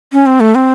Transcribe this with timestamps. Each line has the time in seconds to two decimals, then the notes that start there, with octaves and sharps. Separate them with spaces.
0.13 C#4
0.26 C4
0.40 A3
0.55 C4